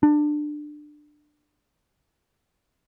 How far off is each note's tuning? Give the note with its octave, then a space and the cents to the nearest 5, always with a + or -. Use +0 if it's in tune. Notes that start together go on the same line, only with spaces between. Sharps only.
D4 +20